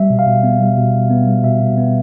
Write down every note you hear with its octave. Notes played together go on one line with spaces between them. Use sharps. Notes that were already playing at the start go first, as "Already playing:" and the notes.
Already playing: G3 E5
B2
F5
B2
B3
G3
B2
B2
B3
G3
B2 E5
B2
B3